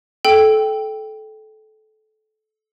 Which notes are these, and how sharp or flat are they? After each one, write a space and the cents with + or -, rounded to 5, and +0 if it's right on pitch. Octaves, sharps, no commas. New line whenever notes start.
A4 -25 G5 +0 E6 +0